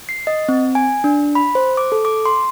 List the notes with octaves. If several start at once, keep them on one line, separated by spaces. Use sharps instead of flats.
C7
D#5
C4
G#5
D4
B5
C5
D6
A4
D6
C6